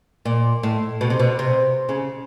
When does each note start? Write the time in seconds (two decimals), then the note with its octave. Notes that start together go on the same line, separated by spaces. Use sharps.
0.25 A#2
0.63 A2
1.01 B2
1.10 C3
1.19 B2
1.39 C3
1.89 C#3